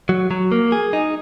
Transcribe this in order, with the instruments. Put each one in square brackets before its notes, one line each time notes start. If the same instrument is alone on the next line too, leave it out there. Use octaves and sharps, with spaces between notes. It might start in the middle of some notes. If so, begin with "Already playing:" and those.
[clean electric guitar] F#3
F#3
A#3
G#4
D#4